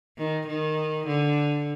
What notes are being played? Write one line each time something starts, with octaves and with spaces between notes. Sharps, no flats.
D#3
D#3
D3